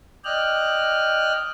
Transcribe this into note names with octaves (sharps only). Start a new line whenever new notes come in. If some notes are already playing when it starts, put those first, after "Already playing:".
D5 D#5 G5 F6 F#6